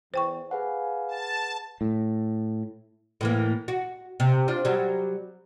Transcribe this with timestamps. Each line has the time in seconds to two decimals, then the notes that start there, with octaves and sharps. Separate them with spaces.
0.14 E2 C5 G5 C#6
0.51 G#4 B4 F5 F#5 G#5
1.08 A5
1.81 A2
3.21 A2 E3 A#3
3.68 F#4
4.20 C3
4.48 D4 F4 C5
4.65 F#3 G3